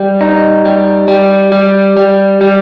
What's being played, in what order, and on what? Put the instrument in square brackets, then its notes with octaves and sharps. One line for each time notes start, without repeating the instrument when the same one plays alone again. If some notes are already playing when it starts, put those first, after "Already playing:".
Already playing: [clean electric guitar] G3
D#4
G3
G3
G3
G3
G3